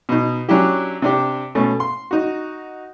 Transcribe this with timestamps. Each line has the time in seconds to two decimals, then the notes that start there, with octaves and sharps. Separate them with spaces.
0.09 B2 D#4
0.49 F#3 C#4 D4 E4 G4
1.02 C3 D4 G4
1.55 B2 A3 C#4
1.80 C6
2.11 D#4 F#4